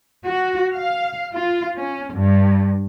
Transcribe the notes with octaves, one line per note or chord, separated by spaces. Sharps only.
F#4
F5
F4
C#4
G2